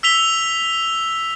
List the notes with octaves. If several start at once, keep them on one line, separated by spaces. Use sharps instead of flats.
E6 B6 F7 G7